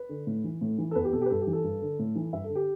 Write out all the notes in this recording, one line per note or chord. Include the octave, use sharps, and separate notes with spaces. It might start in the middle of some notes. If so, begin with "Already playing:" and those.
Already playing: B4
D3
A2
E3
A2
E3
A4
E2 B4
G4
B2 A4
G4
B4
G2 A4
G4
E3
A4
G2
D3
A2
E3
G2 E5
A4
D3
G4